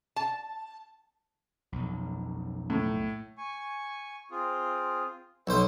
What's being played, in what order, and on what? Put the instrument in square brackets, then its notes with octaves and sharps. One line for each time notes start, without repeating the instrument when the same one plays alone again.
[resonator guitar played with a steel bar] A5
[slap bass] B1 F2
[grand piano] A2
[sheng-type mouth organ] G#5 C#6
C4 F4 G#4
[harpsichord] B1 C5 [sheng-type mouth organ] B4 E6